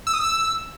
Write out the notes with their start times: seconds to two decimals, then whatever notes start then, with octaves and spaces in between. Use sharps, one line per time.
0.07 E6
0.13 D#6
0.20 E6